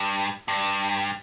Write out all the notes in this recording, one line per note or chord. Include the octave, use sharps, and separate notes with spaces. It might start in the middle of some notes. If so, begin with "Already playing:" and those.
Already playing: G2
G2